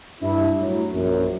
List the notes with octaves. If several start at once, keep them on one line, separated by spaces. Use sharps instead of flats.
G2 D4 E4
A2 F#3
A#1 F#2